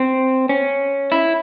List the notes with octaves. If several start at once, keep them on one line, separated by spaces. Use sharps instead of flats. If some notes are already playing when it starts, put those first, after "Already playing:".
Already playing: C4
C#4
E4